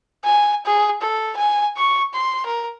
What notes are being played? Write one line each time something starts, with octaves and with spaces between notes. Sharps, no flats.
G#5
G#4
A4
G#5
C#6
C6
A#4